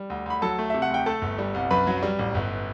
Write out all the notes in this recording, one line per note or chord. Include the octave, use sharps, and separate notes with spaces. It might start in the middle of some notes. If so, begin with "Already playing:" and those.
Already playing: G3
D2
D2 B5
F#3 A4 A5
A3
C3 E5
F#5
D2 G5
A3 A4 A5
G1
G3
C2
F#2 B4 B5
F#3
G3
A1
G1